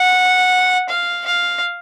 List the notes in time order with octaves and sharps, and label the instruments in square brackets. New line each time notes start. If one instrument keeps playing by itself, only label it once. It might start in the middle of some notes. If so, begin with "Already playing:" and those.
Already playing: [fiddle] F#5
F5
F5